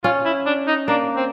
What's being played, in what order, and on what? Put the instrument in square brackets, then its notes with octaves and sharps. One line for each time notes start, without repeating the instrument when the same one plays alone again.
[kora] C#4 [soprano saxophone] F4
[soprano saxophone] E4
D4
D#4
[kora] A#3 [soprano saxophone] D4
[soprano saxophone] C4